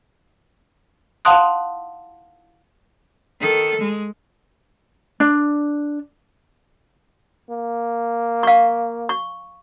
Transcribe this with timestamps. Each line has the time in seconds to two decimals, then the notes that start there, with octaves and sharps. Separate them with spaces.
1.25 F5 F#5 A5 C6 D#6 F#6
3.40 D#3 A4
3.80 G#3
5.20 D4
7.50 A#3
8.43 F5 C#6
9.09 C#6